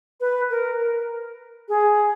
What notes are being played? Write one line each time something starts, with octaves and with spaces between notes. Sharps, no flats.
B4
A#4
A#4
G#4